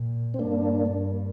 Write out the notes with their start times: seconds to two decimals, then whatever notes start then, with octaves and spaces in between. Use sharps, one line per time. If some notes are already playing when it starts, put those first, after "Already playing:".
Already playing: A#2
0.34 C4
0.39 G2 A#3 D4
0.91 G2